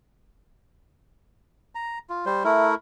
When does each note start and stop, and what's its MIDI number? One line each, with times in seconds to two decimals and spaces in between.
1.75 1.99 82
2.10 2.25 65
2.26 2.43 55
2.26 2.43 72
2.44 2.75 57
2.44 2.75 64
2.44 2.75 70